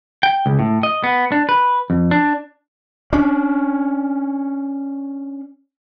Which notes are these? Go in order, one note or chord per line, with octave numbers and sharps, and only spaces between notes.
G5
C#2
A2
D#5
B3
D4
B4
F2
D4
C#4 D4